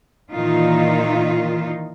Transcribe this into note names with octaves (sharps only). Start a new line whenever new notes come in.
A#2 D#3 E3 D#4 F4